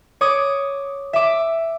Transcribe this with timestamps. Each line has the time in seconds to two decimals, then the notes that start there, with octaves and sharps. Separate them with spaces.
0.21 C#5 D6 D#6
1.13 E5 D6